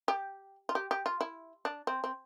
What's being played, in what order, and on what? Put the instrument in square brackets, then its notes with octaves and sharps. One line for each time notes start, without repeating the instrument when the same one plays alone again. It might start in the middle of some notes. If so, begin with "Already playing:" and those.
[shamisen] G4
F4
G4
G4
F4
E4
D4
C4
C4